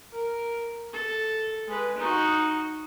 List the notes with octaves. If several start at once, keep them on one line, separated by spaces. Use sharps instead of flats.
A#4
A4
G#3 B4
D#4 F#4